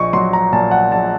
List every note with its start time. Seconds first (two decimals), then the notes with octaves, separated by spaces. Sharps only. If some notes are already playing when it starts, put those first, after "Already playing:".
Already playing: A#1 D#5 C#6
0.13 F#3 C6
0.33 A#5
0.52 A#2 A5
0.71 F#5
0.92 A#1 A5